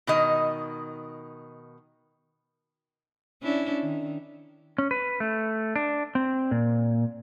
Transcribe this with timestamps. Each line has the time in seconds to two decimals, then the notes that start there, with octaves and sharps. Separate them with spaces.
0.07 B2 D#3 D#5
3.43 C#4 D4 E4
3.83 D#3
4.78 C#4
4.91 B4
5.20 A3
5.76 D4
6.15 C4
6.51 A#2